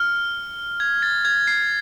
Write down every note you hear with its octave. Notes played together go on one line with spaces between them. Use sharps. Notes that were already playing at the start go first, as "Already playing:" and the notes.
Already playing: F6
G#6
A6
G#6
C7